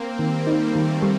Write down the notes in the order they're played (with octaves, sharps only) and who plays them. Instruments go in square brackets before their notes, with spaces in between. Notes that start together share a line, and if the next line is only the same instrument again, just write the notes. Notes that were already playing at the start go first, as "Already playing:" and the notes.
Already playing: [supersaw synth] A#3 C4
[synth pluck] D#3 [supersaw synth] G3
[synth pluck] D#4
[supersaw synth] A3
[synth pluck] D#3
G3